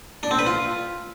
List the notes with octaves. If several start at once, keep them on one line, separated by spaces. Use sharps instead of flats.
D4
C4
B4
F4